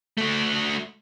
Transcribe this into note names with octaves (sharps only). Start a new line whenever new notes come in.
A3 F#4